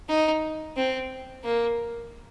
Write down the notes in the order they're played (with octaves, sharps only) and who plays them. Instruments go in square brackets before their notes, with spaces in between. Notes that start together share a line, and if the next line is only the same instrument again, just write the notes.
[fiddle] D#4
C4
A#3